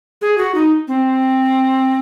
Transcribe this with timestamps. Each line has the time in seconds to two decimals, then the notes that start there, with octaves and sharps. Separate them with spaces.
0.22 G#4
0.38 F#4
0.55 D#4
0.88 C4